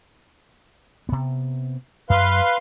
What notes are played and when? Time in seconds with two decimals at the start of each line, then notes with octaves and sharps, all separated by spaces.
1.09 C3 B3
2.10 F#2 B4 F5 C6